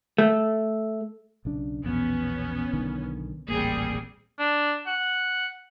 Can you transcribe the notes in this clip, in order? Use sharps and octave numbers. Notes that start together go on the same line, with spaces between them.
A3
B1 C#3 D4
A#1 E2 B2 B3 C#4
B1 D3 D#3
D#1 A1 G3 A#3 C4 G#4
D4
F#5